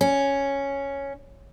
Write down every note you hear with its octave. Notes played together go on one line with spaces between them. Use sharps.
C#4